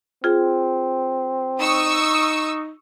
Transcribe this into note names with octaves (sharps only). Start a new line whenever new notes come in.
C4 F4 G#4
D#4 C#6 D#6 E6